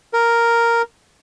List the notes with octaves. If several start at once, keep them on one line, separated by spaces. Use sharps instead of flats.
A#4